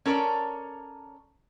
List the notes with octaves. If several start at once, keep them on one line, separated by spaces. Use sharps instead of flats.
C#4 A4 A#4 C#5 D5